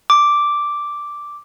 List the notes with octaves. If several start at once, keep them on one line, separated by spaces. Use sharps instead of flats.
D6